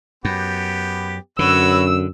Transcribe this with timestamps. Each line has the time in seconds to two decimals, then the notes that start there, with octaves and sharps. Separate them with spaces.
0.25 F#2 B3 G4
1.39 F#2 D3 F#4 B4 C#5 E6